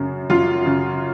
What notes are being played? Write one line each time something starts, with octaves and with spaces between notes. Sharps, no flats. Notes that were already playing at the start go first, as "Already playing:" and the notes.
Already playing: F#2 C#3
F#2 F4
C#3